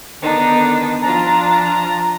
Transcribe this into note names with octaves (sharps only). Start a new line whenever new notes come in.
D3 D#3 B3 D4 D#4
F3 D4 F4 A5 A#5